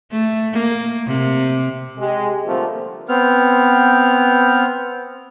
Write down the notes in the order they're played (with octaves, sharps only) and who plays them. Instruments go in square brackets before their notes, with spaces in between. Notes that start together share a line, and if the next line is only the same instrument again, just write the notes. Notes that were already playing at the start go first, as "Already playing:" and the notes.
[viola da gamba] A3
A#3
C3
[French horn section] G#3 G4
D3 F3 G3 A3 A#3 C4
[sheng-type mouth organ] B3 C4 F6